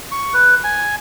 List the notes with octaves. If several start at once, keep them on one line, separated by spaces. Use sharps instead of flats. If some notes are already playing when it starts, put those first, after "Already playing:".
C#6
B4
G#5